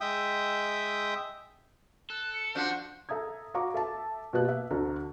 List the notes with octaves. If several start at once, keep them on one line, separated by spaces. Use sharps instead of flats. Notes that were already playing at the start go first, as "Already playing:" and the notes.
G#3 E5 G5 D#6
A4 F#6
C#7
F3 D4 F#4 F#5 G6
A4 E5 A#5 D#6 G#6
F#4 F5 A#5 C#6 D6
A4 E5 A5
B2 A#3 G4 B4 A5 F#6
E5
D2 D3 F#4 A4 A#5